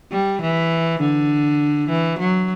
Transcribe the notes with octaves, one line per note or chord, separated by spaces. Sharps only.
G3
E3
D3
E3
F#3